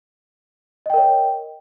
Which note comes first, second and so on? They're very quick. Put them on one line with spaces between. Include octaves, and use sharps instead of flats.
D#5 G5 A#4 C#5